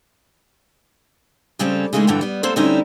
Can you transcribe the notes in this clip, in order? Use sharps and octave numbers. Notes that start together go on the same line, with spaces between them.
C#3 G3 C4 C#4 A4
C#3 E3 G#3 A3 D#4 G#4
D2 G2 D3 E3 A4 G5
G3 B3
A#3 C4 A4 C5
D3 G3 C4 C#4 D#4 E4